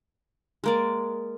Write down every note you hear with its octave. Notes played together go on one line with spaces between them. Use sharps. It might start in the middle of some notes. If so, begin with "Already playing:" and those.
G#3 A#3 D5